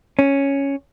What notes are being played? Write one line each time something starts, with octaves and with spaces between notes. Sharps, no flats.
C#4